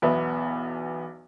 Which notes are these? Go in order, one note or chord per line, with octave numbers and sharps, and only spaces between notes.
B1 E2 B3 E5